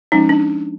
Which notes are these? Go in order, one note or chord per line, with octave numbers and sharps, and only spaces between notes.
F3 G#3 C#4 D#4
D4